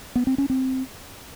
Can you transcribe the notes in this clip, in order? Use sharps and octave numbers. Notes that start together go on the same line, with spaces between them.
B3
C4
C#4
C4